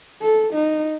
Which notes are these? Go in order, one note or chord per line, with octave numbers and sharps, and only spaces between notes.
A4
D#4